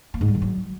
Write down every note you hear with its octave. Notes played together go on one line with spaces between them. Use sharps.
A#3
G#2
G3
D#3
F#3